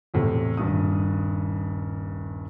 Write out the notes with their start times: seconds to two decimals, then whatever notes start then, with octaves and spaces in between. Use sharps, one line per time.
0.14 E2 A2 C3
0.57 D#1 G2 D#6